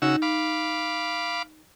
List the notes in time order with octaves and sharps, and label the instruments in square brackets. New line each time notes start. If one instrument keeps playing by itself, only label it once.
[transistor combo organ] C#3 F#4 E6 [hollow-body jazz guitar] D#4
[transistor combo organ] F5 B5 D6